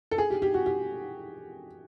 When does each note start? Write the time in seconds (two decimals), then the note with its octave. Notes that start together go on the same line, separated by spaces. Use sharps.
0.11 A4
0.18 G#4
0.30 G4
0.42 G4
0.54 F#4
0.66 G4